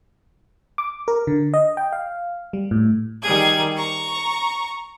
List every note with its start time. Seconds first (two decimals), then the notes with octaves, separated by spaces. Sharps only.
0.78 D6
1.08 A#4
1.27 D3
1.54 D#5
1.77 G5
1.93 F5
2.53 G3
2.71 A2
3.23 D#3 G3 G#4 G#6
3.77 A#5 C#6